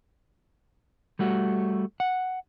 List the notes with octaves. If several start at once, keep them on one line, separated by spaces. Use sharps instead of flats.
G3 A3 F#4
F#5